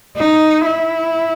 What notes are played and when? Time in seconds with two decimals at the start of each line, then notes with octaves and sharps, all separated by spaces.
0.18 D#4
0.66 E4